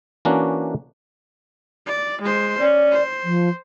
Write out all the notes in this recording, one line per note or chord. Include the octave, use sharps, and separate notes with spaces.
E3 A#3 C#4 D4 F#4
D5
G#3 C5
C#4 D5
C5
F3